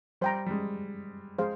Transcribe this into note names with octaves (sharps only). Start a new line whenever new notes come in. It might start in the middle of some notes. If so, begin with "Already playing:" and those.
G3 C5 G5 A#5
G3
G#3
G#3 G#4 C5 F5